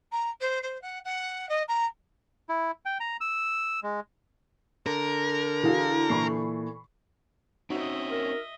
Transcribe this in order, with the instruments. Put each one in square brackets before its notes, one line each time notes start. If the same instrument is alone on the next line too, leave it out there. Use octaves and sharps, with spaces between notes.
[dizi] A#5
C5
C5
F#5
F#5
D#5
A#5
[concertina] E4
G5
A#5
E6
G#3
[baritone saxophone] D3 [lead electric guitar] A#4
[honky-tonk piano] E3 F#4 [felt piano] G#4 F5
[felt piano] A#2 E3 A4 [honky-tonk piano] B5 C#6 C7
[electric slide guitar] C4 C#4 [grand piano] D#4 F#4 [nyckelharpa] D#5 E5
[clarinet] A#4